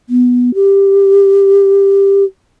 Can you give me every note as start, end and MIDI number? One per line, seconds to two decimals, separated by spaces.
0.09 0.54 59
0.54 2.24 67